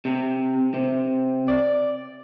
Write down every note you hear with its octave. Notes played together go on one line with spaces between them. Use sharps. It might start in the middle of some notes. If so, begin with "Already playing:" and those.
C3
C3
D5